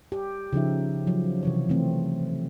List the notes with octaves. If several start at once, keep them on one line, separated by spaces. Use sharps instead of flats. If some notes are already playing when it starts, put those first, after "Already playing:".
G4
C#3 F3 D#4 E5
F3 F#3
C3 E3 C#5
E3 A3 C4